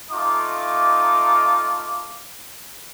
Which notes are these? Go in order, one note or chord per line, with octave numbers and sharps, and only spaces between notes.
A3 D#4 F4 D6